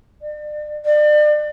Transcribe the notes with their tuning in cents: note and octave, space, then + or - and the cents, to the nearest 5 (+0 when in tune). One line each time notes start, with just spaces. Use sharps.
D5 +40
D5 +35